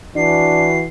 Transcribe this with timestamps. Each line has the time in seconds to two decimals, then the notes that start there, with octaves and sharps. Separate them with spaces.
0.16 E3 D4 F#4 C7